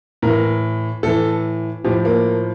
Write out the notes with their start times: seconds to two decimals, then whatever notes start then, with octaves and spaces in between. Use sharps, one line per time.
0.22 A2 E3 A#4
1.03 A2 E3 A4
1.85 A2 F3 G4
2.05 A#3